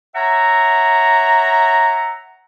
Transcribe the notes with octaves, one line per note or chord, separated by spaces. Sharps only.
C#5 E5 F#5 A#5